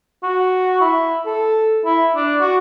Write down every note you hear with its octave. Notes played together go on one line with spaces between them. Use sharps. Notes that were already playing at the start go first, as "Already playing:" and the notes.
F#4
E4
A4
E4
D4
F#4